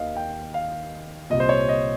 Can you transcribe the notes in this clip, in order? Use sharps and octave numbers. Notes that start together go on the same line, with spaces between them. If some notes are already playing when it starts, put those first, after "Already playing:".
Already playing: D#2 D#3 D#5 F5
G5
F5
C2 A#2 D#5
C5
C#5
D#5